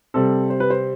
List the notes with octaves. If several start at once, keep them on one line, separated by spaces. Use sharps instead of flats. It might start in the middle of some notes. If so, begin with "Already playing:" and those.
C3 G3 C4 A4
C5
B4
C5